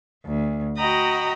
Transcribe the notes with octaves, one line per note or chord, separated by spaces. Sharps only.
D2
F#4 D#5 G5 A#5 B5 D#6